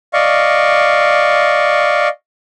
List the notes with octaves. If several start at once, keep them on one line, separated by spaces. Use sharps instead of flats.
D5 D#5 F5 C#6